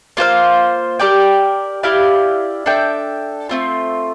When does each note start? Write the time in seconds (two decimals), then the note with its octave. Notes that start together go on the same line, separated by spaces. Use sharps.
0.17 A#3 F4 C5 F5
0.99 G4 A#4 D5 G5
1.83 E4 G4 D5 F5
2.66 D4 A4 E5 G5
3.49 A3 C4 F4